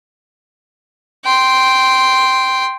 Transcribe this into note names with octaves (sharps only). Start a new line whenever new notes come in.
G5 C6